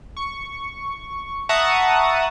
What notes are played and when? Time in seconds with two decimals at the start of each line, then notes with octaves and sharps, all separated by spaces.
0.17 C#6
1.49 E5 F#5 A5 A#5 C#6 D#6